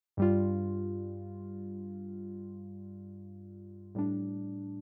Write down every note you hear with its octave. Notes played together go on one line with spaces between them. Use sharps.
G2 G3 F4
A2 G3 D4